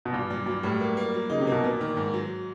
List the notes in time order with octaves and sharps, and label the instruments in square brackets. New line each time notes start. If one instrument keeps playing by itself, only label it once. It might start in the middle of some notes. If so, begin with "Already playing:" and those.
[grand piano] B2
[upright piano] G2 [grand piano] A#2
[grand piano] A#2 [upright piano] F#3
[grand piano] A#2 [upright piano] F#3
[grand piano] A2 [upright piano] G3
[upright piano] A#3
A#3
F#3
[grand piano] C#3 [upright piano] D#4
[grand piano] C3
[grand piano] B2 [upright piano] A#3
[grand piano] A#2 [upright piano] B3
[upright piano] D#3
G#2
F#3